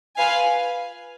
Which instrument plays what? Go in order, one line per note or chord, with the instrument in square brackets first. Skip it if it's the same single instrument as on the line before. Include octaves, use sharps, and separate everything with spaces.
[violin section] F4 B4 F5 G#5